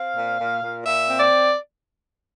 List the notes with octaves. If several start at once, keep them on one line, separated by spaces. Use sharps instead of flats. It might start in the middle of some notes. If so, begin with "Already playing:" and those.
Already playing: C4 F5
A#2
A#2
A#2
A#2 E5
C4
D5